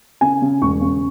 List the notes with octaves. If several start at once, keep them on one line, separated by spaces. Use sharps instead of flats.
C#3 G#5
C#3
E1 C#6
C#3